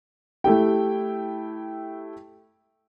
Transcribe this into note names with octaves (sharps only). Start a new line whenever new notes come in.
A3 E4 G4 G5